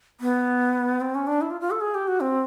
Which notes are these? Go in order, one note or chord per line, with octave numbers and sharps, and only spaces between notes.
B3
C4
C#4
D4
E4
F4
F4
A4
G#4
G4
F#4
C4